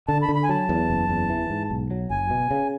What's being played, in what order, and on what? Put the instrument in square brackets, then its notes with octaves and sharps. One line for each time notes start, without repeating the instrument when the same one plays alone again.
[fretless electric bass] D3 [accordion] A5
[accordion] B5
[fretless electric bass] D3
[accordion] B5
G#5
[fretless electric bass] F#3 [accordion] A5
[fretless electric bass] E2
F#1
E2
E3
G#2
B1
F#3
[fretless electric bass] F#1 [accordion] G#5
[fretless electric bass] B2
C#3